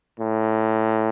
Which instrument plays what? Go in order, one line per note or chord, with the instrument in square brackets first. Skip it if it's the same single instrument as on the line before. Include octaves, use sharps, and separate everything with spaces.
[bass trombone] A2